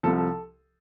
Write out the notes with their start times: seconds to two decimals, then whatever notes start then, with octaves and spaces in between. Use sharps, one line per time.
0.03 C2 C3 F3 A4
0.18 A4